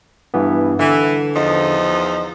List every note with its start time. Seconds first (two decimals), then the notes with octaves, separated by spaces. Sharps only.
0.34 G2 E3 B3
0.79 D3 E3
1.35 E2 F3 D#4